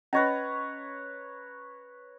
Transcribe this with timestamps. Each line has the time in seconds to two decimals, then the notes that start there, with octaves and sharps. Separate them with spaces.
0.13 C#4 B4 C#5 D#5 A#5